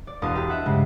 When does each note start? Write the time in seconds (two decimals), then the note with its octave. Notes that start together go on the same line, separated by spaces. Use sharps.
0.07 D5
0.22 E1 E2 F5 A5 D#6
0.35 E4 G4 D#5
0.49 E5 F#5
0.65 G2 C#3 G#3